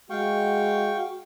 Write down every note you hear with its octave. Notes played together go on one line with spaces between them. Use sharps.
G#3 F#4 F5 G5 C#6